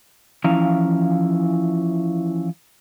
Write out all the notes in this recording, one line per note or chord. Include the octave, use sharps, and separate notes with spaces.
E3 F3 C#4 E4 F5 A#5